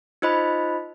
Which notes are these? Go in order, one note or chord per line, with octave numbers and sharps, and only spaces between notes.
D#4 F4 C5 D#5 B5